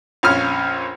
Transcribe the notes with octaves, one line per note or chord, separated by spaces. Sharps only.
A#1 F2 C#4 F6